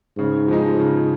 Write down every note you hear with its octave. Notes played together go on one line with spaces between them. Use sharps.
G#2 C#3
F3 G#3 D#4
C#3